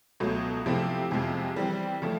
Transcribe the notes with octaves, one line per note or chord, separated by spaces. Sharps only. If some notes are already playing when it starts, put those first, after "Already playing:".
C#2 B2 F#3 A3
C3 F3 A3 C4 E4
F2 C3 F3 G#3
E3 G3 C4
C#3 F3 A3